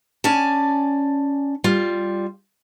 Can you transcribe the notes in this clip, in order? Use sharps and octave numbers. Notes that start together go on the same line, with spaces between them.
C#4 D5 G#5 A5
G3 F4